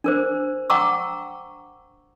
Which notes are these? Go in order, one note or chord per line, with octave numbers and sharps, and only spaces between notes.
D4 A#4 C5
F#5 G5 A#5 C#6 D6 E6